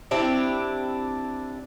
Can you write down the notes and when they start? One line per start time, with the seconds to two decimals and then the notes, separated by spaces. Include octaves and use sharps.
0.11 C4 D4 E4 G4